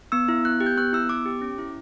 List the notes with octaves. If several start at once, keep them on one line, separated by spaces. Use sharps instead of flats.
B3 E6
E4
B3 F#6
G4
G6
B3 F#6
E4 E6
B3 D6
G4
C#4
E4